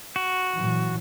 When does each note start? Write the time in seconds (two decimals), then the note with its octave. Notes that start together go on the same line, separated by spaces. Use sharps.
0.16 F#4
0.55 A#2 E3 F#3